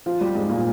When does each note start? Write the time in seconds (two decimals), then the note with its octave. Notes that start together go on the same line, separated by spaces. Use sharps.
0.06 F3 F4
0.21 G3 G4
0.35 G#2 G#3
0.49 A#2 A#3